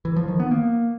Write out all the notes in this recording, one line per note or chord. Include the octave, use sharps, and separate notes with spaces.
E3
F3
D#3
B3
A#3